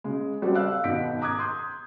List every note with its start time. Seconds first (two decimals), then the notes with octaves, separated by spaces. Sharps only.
0.04 C#3 G#3
0.42 G3 C4 C#4 F#4 A4 D5
0.55 F5 E6 F#6
0.84 G#1 B2 G6 B6 D7
1.21 A#5 D6 D#6 F#6 G#6
1.39 C6 D#6 G6